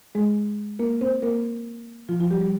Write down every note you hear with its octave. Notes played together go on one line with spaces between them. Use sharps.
G#3 G#4
A#3 A#4
C4 C5
A#3 A#4
F3 F4
F3 F4
G3 G4
G3 G4